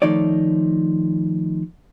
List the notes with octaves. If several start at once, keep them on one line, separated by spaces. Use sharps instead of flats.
D#3 F3 A3 D#4 C#5 D5